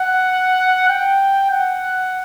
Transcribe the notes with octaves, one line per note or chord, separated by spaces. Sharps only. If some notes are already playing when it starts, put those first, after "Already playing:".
Already playing: F#5
G5
F#5